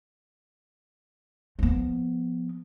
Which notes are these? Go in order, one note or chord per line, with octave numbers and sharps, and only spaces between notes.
F3 B3